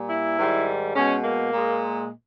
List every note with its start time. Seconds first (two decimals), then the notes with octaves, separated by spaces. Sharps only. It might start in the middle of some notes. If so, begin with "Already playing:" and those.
Already playing: A#2 G3
0.09 E4
0.38 G#2 D#3 G3
0.95 B2 G#3 C#4
1.24 A#3
1.53 A#2 G#3